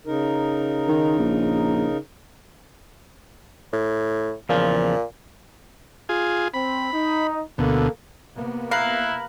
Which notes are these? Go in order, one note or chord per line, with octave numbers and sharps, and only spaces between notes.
C#3 D#4 A#4
D#3
A#1
A2
E2 A#2 C#3 F3
F4 G#4
C4 B5
D#4
D2 B2 A#3 A4
C3 A#3 B3
E4 F5 A#5 B5 F#6